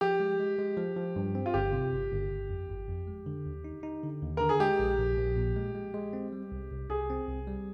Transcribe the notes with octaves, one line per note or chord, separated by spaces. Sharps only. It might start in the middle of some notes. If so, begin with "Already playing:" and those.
F3 G4
G#3
G#3
G#3
F3
F3
G2
C4
F4
G1 G4
C3
G1
G1
G1
F2
G1
F2
G#3
D3
D#2
D#4
D#4
D3
D#2
D3 A#4
G#4
G#3 G4
A#1
A#1
A#1
A#2
G#3
G#3
G#3
C4
G3
C2
C2
C2 G#4
C4
C2
G3